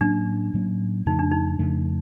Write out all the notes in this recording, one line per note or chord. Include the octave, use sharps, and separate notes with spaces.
A2 F#3 A#3 C#4 D4
A2 F#3 A#3 C#4
F2 C#3 F3 A3 D#4
D4
D#4
F2 C#3 F3 A3